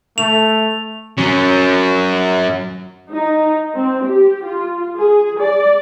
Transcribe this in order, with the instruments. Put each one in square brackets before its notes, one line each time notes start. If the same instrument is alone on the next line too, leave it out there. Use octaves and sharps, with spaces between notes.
[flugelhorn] A3 [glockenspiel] F7
[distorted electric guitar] F#3 C#4
[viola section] D#4
C4
G4
F4
G#4
D5